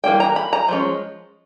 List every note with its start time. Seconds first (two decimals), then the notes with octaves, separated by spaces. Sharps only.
0.04 E3 G3 A#3 D4 G5
0.20 A#5
0.36 B5
0.53 A#5
0.69 F3 G#3 C#4